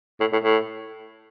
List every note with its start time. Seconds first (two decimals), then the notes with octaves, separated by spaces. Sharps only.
0.20 A2
0.32 A2
0.43 A2